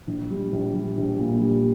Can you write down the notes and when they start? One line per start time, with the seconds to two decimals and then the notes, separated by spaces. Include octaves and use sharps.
0.07 A#1
0.30 G3
0.52 A#1
0.74 G3
0.97 A#1
1.19 A#2
1.41 G3